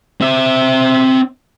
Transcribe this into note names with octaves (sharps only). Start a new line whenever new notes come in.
C4 E5